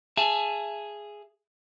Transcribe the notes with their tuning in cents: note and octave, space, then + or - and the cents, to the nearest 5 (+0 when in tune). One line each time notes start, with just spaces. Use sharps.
G#4 +0 E5 +30 A5 +0